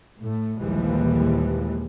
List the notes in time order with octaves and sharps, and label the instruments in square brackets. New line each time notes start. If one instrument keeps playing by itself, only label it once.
[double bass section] A2 A3
A#1 D#2 E3 F3 G3 G#3